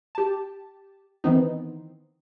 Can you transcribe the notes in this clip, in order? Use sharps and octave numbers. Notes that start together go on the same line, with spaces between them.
G4 A5
D#3 E3 B3 C4 D#4